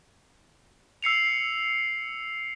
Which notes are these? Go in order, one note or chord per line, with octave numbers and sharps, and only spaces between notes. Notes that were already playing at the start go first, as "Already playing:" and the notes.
E6 C7 C#7 F7